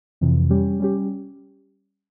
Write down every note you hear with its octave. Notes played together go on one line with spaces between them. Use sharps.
F2 C3 E3
G3 C#4 G4
G3 C#4 G4